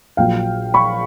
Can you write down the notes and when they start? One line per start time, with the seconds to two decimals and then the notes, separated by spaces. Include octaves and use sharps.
0.17 A#1 A#2 F#3 F5 G5
0.74 B5 C#6